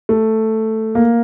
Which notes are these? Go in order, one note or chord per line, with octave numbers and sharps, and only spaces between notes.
A3
A#3